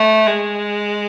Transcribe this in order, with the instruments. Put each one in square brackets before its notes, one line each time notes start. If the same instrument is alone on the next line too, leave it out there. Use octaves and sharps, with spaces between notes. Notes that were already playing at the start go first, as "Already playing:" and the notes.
Already playing: [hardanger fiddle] A3
G#3